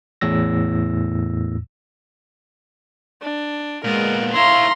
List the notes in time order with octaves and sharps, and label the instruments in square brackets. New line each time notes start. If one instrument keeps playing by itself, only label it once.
[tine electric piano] E2 A2 E6 A#6
[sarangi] D4
[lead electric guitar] A#2 B3 [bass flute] G#3 [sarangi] A#4
[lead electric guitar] E4 C#5 [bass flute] F5 [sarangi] A#5 [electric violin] C6